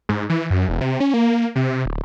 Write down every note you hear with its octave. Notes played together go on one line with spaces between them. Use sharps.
G#2
E3
F#2
E1
C3
C#4
A#3
C3
D1